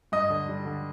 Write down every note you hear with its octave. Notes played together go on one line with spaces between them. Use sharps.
G2 D#5 D#6
D3
G3
D3